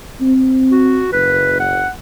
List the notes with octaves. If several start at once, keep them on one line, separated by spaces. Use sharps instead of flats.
C4
F#4
F#1 B4
F#5